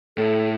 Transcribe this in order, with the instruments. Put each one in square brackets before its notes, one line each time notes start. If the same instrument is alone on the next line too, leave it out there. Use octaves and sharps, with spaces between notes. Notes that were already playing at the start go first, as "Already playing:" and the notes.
[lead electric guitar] A2 [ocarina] A4